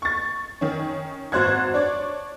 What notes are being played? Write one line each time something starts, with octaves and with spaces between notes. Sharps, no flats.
C#6 A6
D#3 C#4
G#1 F#4 C5 F#6 G#6
D4 C#5 D5